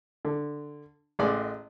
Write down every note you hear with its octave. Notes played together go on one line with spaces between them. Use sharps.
D3
A1 G#3 D5